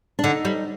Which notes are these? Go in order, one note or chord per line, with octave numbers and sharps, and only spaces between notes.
D4
D3 D#4
G3